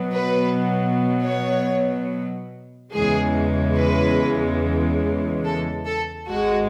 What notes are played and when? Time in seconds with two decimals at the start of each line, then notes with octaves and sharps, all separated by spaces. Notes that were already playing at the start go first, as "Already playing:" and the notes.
Already playing: B2 F#3 B3
0.12 B4
1.23 C#5
2.92 E2 C#3 E3 G#3 G#4
3.76 B4
5.45 A4
5.86 A4
6.28 G#1 G#2 G#3 F#4